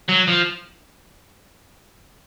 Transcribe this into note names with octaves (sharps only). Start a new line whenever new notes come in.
F#3
F3